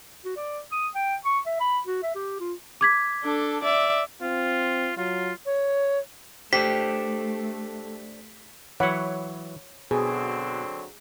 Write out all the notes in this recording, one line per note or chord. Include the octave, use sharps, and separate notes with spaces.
F#4
D5
D#6
G5
C#6
E5
B5
F#4
E5
G4
F4
D6 G#6 B6
D4 A4
D5 E5
C4 F4
F#3 F4
C#5
A3 D4 G4 A4 C5 B6
E3 F#3 C#5 F#5 B5
B2 D3 F#3 C4 G#4